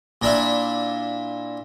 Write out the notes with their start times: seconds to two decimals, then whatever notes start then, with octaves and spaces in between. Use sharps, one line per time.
0.22 A#2 D4 E4